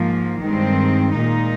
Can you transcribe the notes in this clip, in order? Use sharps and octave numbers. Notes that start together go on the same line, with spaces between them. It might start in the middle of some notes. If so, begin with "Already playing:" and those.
Already playing: G#2 F3 A#3
G2 D#3 G#3 C4
A#2 G#3 D#4